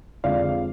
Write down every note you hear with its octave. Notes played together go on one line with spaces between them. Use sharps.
F2 D3 F3 G#3 D5 F5